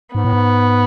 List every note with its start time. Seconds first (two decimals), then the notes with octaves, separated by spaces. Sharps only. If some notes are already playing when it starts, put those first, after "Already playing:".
0.15 G#2 B3
0.25 A2
0.33 G#2